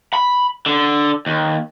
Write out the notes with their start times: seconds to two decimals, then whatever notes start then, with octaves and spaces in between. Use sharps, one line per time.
0.14 B5
0.66 D3
1.26 D#2